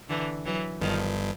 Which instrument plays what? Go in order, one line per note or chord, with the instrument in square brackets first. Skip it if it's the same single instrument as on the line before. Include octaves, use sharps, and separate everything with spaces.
[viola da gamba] D3 E3
E3 F#3
[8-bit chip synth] G1 G2 [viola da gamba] D#3 F3